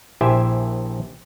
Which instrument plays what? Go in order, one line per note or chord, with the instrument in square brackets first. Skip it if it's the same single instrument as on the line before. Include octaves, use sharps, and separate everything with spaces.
[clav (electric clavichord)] A#1 E4 G4 C5 E5 G#5